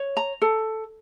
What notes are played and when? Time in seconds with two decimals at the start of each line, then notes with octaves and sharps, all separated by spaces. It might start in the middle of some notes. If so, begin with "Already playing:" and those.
Already playing: C#5
0.17 A#5
0.42 A4